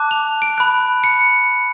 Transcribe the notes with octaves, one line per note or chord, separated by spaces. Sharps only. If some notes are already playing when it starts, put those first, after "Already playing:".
Already playing: A5 D6 F#6
F7
D7
B5 F#6
C#7